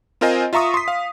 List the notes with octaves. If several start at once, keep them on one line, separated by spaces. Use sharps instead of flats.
C4 F4 A#4 C5 D#5 G#5
F4 E5 A#5 C#6 D#6
C6 B6
F5